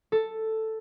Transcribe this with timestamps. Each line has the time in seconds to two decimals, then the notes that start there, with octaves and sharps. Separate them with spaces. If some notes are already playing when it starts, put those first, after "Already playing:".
0.12 A4